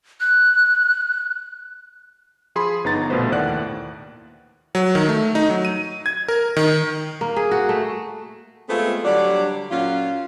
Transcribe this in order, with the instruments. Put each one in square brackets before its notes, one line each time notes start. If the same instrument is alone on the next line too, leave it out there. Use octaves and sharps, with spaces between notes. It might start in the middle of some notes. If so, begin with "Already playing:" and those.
[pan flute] F#6
[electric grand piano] F3 G#4 B5 C6
G1 B3 D#4 A#5 A6
A#1 B2 A3 F4 B4 C5
D#2 A2 D5 F#5 F#6
F#3
D#3
A3
D#4
F#3
D#7
G#6
A#4
D#3
[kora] A#3
G#4
F#4
A3
[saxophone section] G#3 A3 B3 C4 F4 A4
D3 F#3 G3 D4 D5
A#2 F#3 C#4 F4